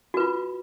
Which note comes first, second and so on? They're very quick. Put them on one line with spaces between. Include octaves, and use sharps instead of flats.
F#4 B4 F4